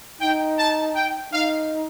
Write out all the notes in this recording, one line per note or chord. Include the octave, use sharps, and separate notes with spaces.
D#4 G5
A5
G5
D#4 F5